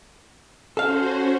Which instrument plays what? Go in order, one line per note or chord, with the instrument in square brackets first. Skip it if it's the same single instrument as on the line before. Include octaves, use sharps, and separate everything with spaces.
[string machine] C#4 F#4 C5 [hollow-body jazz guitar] A4 F5